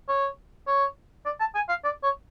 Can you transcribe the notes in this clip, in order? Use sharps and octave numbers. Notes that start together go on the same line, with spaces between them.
C#5
C#5
D5
A5
G#5
F5
D5
C#5